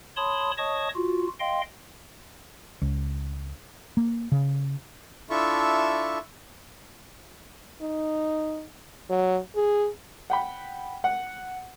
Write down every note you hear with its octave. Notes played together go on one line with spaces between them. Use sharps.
C#5 A5 B5 C6 D#6
C#5 D#5 A5 C#6 D#6
F4 F#4
D#5 F5 G5 C6
C#2
A#3
C#3
D4 E4 F4 A4 E5 C#6
D#4
F#3
G#4
F#5 G5 B5
F#5